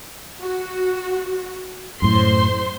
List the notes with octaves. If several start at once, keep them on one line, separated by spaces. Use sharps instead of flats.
F#4
F#2 A2 C5 C6